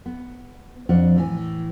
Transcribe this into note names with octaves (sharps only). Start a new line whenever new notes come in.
B3
F2 F3 D4 F#4 F#5
A2 E3 G#5